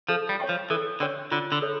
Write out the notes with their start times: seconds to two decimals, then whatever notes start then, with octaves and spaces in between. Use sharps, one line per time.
0.09 F3 A4
0.29 G3
0.40 C#5 G5 C#6
0.49 F3
0.70 E3 A4
1.00 D3 C#5 G5 C#6
1.31 D3 F4
1.52 D3
1.62 A4 C#5